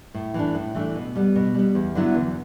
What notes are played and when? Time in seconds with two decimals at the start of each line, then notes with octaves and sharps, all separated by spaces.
0.14 A2
0.34 E3 A3 D4
0.55 A2
0.74 E3 A3 D4
0.95 B2
1.16 G3 B3
1.36 B2
1.54 G3 B3
1.75 E2
1.95 D3 F#3 B3 E4
2.15 E2